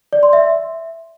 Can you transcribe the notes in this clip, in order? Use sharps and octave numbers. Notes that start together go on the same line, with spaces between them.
D5
C6
E5